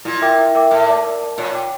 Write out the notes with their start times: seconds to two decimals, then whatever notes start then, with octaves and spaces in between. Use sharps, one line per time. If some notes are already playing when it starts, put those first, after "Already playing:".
0.05 A#2 E4
0.22 A#4 E5 G5 D6
0.38 E4
0.55 A#4 E5 G5 D6
0.71 A2 A#4
0.88 D5 A5 D6
1.05 A#4
1.21 D5 A5 D6
1.38 A#2 C#5
1.55 G5 D6